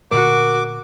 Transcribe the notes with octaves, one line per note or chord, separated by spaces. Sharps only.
A#2 D3 A3 F#4 A#4 D6